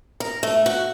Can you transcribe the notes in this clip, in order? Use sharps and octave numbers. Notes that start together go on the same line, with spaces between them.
A#4
A3
F#4